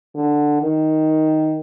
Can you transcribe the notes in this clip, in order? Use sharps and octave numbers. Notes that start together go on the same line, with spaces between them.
D3
D#3